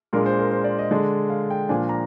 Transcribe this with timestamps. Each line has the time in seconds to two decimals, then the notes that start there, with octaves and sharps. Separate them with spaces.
0.13 A#2 G#3 D4 A#4
0.26 C5
0.39 A#4
0.52 C5
0.64 D5
0.78 D#5
0.91 D3 G#3 D4
1.30 F5
1.50 G5
1.69 A#2 F3 A#3 D4 G#5
1.89 A#5